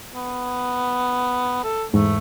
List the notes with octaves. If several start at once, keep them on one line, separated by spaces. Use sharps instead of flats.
B3
A4
E2 G#2 A3